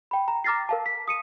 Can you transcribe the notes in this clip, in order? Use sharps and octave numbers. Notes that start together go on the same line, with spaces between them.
G5 B5
A#5
A#5 D6 F6 A6 A#6 C7
A#4 F5 A5
B6
D#6 C#7 D#7